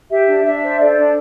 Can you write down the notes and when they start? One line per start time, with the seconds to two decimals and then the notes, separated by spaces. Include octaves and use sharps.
0.10 G4 E5
0.28 D4
0.45 D4 E5
0.62 C5
0.79 A4 D5
0.97 D4